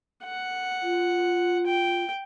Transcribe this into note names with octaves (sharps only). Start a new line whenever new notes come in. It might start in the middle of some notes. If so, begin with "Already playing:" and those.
F#5
F4
G5